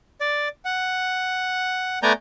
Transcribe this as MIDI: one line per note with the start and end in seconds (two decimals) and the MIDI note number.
0.21 0.48 74
0.65 1.99 78
2.03 2.13 57
2.03 2.13 59
2.03 2.13 74
2.03 2.13 80
2.03 2.13 82
2.03 2.13 91